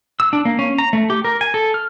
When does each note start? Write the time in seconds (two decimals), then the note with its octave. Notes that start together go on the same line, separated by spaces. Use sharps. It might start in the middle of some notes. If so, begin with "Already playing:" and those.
0.20 E6
0.33 D4
0.45 A#3
0.59 C#4
0.78 A#5
0.93 A3
1.10 G4
1.25 A#4
1.41 G#5
1.54 A4
1.74 F6